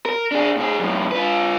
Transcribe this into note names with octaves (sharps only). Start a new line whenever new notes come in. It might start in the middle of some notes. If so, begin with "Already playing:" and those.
A#4
D4 G#4
A2 G#4
F#2 A2
F4 B4